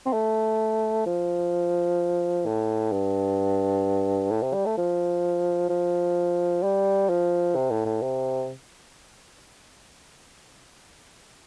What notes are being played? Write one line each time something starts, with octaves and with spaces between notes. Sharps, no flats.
C4
A3
F3
A2
G2
A2
C3
G3
A3
F3
F3
G3
F3
C3
A2
A2
C3